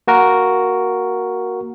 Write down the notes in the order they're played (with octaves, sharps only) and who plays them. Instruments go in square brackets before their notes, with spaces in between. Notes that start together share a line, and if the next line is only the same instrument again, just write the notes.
[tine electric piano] A#3 F#4 A#4